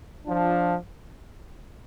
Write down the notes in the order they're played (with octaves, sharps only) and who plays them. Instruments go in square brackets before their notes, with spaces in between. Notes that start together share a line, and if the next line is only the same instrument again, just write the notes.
[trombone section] F3 D4 F4